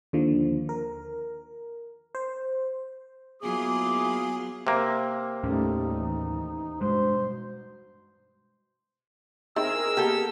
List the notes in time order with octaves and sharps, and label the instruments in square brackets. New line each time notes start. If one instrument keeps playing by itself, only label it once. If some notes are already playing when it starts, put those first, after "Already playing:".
[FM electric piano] D#2 D3 F3
A#4
C5
[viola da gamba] F#3 B3 F4 [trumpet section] A#3 E4 D6 [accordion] G#4
[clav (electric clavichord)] C3 A#3
[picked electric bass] D#2 A2 C#4 [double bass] G3 A3 [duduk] D#4
[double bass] E3
[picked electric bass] G2 G#3 [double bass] B2 [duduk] C5
[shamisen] D#3 C4 E4 [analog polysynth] G#4 A#4 [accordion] E6
[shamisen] A#3 B3 [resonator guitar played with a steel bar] G4 A4